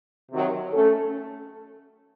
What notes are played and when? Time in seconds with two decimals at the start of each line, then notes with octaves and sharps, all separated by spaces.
0.31 C3 D#3 F#3
0.73 A3 C#4 A4